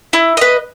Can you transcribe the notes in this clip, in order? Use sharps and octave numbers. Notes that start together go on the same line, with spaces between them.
E4
B4 D#5